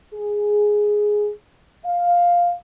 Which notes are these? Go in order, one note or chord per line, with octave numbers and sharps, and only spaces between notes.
G#4
F5